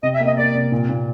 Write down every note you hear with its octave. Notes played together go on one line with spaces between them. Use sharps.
C3 D#5
E5
A#3
D#5
A#3 D5
C3
A#2
A#2